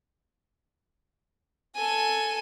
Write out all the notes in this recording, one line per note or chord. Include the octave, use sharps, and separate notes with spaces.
A4 G#5